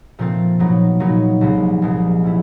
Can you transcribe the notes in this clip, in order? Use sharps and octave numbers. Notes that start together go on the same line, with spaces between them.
A#2 F3 A3 C4 F4
A#2 F#3 B3 D#4 F#4
A#2 F#3 B3 D#4 F#4
C2 A#2 F3 G#3 B3
C2 A#2 F3 G#3 B3
F3 A3 C#4 E4